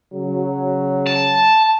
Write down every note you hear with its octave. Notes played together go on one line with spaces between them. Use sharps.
C#3 F#3
A5